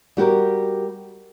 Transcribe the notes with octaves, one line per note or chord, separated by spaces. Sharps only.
G3 F#4 G4 A#4